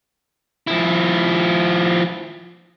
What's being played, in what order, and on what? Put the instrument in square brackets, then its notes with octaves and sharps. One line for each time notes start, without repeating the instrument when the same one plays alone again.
[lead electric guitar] F3 E4